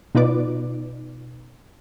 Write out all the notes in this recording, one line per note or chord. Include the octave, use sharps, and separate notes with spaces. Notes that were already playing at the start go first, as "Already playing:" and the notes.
B2 D#4 F4 B4 D5 D6